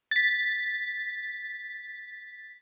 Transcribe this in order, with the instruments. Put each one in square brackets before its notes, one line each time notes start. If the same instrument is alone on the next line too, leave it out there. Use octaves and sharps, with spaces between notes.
[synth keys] A6 B6